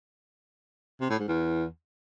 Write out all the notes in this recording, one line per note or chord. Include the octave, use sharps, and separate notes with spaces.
C3
A2
G#2
E2